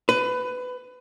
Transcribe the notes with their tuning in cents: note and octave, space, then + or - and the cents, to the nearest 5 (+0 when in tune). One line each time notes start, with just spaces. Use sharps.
B4 +20